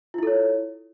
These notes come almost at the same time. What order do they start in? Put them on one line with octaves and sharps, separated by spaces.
F4 E4 A4 C#5